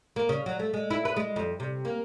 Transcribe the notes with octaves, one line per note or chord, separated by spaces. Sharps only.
A#3
C#3
F#3
A3
G#3
E4
B4
G#3
F2
C3
A#3